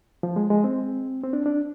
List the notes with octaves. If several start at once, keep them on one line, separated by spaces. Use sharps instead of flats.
F3
G#3
G#3
C4
C4
D4
D4